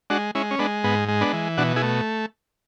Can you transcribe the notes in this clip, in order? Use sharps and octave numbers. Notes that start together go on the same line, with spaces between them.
G#3 D4 F#4
G#3 C#4 E4
C#4
G#3 B3 D4
G#2 B3
G#3
B3 D4
E3
B2 D4 F#4
E4 G#4
A3